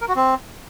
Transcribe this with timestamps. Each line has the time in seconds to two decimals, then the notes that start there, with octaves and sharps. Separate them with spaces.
0.01 A#4
0.08 F#4
0.16 C4